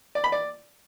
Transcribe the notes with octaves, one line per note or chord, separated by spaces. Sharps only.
D5
B5
D5